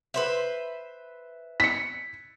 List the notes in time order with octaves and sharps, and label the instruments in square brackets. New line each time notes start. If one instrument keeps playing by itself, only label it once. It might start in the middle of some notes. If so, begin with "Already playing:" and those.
[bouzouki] B4 C5 E5
[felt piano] B6 C#7